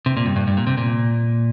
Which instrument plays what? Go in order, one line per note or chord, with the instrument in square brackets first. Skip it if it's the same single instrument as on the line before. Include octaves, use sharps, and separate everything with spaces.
[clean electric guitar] C3
A#2
G2
G2
G2
A#2
C3
A#2